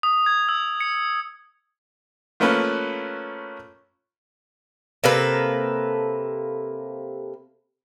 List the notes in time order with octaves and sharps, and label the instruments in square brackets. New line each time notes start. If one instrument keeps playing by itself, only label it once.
[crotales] D#6
G#6
E6
C#7
[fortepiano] F3 A3 A#3 C#4 B4
[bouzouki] C3 A#3 A4 B4